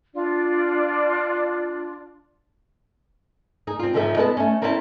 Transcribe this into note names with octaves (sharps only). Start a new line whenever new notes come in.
D4 F4 D5
D#4 G#4
C4 F4
G#2 D3 D#3 F3 A4 E5
G#3 B3 A4 D#5 F5 A5
A3 C#4
A#3 C4 C#4 E4 G5 A5